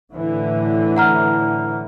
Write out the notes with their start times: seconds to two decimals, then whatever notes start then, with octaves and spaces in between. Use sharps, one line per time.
0.13 A2 D3 E3
0.97 F#5 A#5 F6